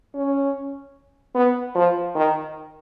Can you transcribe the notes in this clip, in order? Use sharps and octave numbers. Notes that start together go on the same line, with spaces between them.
C#4
B3
F3
D#3